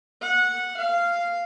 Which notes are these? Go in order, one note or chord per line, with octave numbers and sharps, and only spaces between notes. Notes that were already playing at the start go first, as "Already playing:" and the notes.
F#5
F5